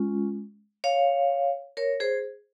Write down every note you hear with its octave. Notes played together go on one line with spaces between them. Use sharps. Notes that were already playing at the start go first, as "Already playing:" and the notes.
Already playing: G#3 C#4 F4
C#5 F5
A#4 C#5
G#4 C5